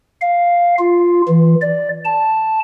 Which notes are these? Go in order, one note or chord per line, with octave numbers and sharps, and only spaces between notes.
F5
F4
E3
D5
A5